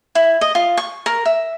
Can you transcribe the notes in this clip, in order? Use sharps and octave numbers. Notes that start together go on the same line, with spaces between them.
E4
D#5
F4
C#6
A#4
E5